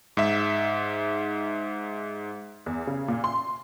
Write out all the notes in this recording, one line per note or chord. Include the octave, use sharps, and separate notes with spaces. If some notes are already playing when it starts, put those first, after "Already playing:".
G#2 E5
E2
C#3
A#2
C6